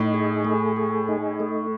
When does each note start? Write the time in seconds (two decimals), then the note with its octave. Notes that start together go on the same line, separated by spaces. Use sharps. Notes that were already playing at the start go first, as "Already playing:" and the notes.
Already playing: A2 D#4
0.14 G#4
0.45 A3
0.77 G#4
1.08 D#4
1.40 A3